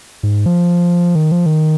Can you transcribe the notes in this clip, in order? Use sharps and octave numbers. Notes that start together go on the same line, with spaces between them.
G#2
F3
D#3
F3
D#3